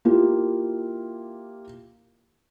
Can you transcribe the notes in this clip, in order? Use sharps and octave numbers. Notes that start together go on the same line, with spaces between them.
A#3 E4 F4 G4